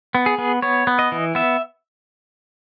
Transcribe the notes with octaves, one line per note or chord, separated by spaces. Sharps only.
B3
G#4
B3
B3 C#5
B3
D#5
E3
B3 E5